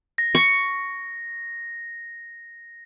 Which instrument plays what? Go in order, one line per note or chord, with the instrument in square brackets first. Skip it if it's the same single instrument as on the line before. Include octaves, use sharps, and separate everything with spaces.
[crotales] A#6
[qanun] C#6